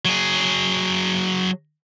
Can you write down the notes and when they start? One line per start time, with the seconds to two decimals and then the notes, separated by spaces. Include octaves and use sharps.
0.05 F#3 G#4